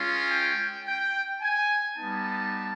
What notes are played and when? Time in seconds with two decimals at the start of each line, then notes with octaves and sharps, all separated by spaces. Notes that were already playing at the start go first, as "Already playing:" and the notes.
Already playing: G#3 C#4 F4
0.30 G5
0.85 G5
1.41 G#5
1.97 G3 B3 D#4 A5